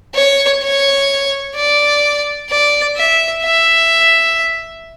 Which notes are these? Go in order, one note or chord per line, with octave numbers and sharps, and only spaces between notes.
C#5
C#5
D5
D5
E5
E5